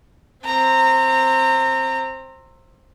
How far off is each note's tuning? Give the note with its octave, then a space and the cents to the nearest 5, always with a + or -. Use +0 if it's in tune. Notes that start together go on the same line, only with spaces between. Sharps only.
C4 +15 A#5 -25